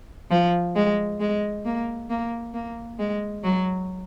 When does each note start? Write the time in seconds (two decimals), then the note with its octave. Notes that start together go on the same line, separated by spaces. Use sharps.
0.31 F3
0.76 G#3
1.20 G#3
1.65 A#3
2.10 A#3
2.54 A#3
2.99 G#3
3.44 F#3